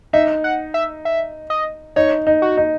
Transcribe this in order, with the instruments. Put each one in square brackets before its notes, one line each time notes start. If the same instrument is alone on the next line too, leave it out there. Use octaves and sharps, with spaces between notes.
[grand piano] D#4 [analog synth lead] E5
[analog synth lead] F#5
E5
E5
D#5
[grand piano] D#4 [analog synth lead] C#5
[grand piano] D#4
[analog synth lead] F#4
[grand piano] D#4